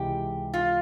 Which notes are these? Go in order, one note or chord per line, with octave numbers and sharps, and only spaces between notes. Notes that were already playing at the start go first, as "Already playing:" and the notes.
Already playing: C#2 C3 E3 G#3 E4 G4
F4